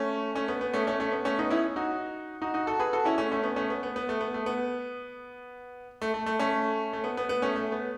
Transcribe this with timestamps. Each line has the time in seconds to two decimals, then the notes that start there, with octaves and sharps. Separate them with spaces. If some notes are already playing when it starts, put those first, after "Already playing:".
Already playing: A3 C#4
0.35 A3 C#4
0.48 B3
0.61 B3
0.73 A3 C#4
0.87 A3 C#4
1.00 A3 C#4
1.12 B3
1.25 A3 C#4
1.39 B3 D#4
1.50 C#4 E4
1.76 D#4 F#4
2.42 D#4 F#4
2.54 D#4 F#4
2.67 F#4 A4
2.80 G#4 B4
2.93 F#4 A4
3.05 C#4 E4
3.18 A3 C#4
3.31 A3 C#4
3.43 B3
3.56 A3 C#4
3.70 B3
3.83 B3
3.96 B3
4.09 A3
4.21 B3
4.34 A3
4.46 B3
6.02 A3
6.14 A3
6.26 A3
6.39 A3 C#4
6.93 A3
7.04 B3
7.17 B3
7.29 B3
7.42 A3 C#4
7.56 A3
7.72 B3